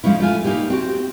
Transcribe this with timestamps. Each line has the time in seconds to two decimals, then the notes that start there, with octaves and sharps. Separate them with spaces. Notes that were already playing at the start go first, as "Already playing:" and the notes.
0.04 F3 G#3 C#4 E4
0.20 A3 F4 G#5
0.44 A#3 D#4 E4 G4
0.70 C4 F#4 G4